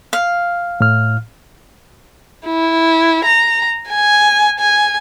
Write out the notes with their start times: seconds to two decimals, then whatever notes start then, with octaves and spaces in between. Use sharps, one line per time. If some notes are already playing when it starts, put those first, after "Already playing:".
0.13 F5
0.80 A2 F6
2.46 E4
3.25 A#5
3.89 G#5
4.60 G#5